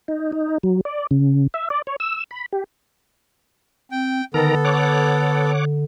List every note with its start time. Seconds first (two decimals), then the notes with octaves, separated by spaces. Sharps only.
0.08 D#4
0.32 D#4
0.63 F#3
0.85 D5
1.11 C#3
1.54 E5
1.70 D5
1.87 C#5
2.00 E6
2.31 B5
2.53 G4
3.92 C4 G5
4.34 D3 D#3 B3 A4 A#4 A#5
4.65 C#5 F#5 D6